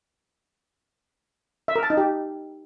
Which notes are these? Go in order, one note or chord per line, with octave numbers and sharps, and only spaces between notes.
E5
A#4
A5
D#4
G4